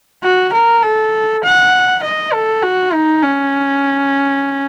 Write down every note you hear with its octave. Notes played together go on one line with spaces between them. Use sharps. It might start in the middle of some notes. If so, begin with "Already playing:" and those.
F#4
A#4
A4
F#5
D#5
A4
F#4
D#4
C#4